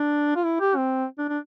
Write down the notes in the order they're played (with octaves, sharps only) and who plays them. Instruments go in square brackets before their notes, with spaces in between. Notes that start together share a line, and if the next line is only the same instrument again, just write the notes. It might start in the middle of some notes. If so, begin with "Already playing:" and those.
Already playing: [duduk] D4
F4
E4
G4
C4
D4
D4